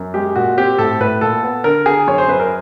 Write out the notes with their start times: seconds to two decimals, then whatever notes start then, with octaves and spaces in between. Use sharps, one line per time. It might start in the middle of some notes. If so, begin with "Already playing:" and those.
Already playing: F#2
0.14 G#3 G4
0.36 A#2 F#4
0.57 C4 G4
0.78 A2 A4
1.01 A2 B4
1.21 A#2 A4
1.43 B3
1.64 D3 A#4
1.86 D3 G#4
2.07 F#2 C#5
2.18 C5
2.28 F#2 B4
2.40 A#4